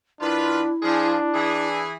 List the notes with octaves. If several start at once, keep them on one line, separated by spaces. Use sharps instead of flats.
D#3 D4 E4 F4 B4
F3 D4 G#4
E3 G#4